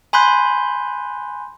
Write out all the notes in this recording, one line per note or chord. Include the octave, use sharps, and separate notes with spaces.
G#5 B5 C6 F#6 G6